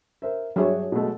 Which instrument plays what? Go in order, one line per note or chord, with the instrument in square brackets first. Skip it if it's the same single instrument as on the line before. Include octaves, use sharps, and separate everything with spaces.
[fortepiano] A#4 C5 E5
[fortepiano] G2 D4 E5 [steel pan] F#3 G#4 C#5
[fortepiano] B2 G#3 A3